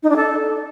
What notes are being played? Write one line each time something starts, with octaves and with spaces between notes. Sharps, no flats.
D#4
D4
A4